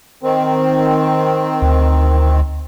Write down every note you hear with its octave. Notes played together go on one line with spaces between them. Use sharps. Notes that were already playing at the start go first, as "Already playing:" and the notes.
D#3 C4
D2